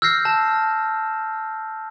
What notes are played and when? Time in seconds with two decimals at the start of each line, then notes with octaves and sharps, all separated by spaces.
0.02 E6 F6 G6 A#6 C7
0.25 A5